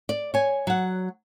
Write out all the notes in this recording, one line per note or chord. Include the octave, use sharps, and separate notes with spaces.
D5
C#5 G#5
F#3 F#5